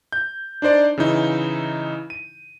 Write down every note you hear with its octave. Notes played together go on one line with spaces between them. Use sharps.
G6
D4 D#4 C5 D5
C#3 E3 D#4 E4
D#7